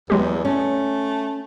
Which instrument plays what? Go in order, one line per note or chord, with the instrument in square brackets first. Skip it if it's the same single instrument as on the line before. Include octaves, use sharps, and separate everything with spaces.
[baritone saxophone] E2 [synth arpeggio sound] F#3 G#3 G4
[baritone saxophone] A3 [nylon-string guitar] C#4